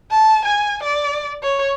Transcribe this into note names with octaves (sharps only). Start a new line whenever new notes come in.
A5
G#5
D5
C#5